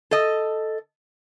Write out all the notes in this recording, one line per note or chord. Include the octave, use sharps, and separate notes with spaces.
A4 D#5